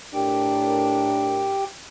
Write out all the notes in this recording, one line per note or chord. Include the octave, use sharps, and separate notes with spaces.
A2 D4 G4 A#4 G5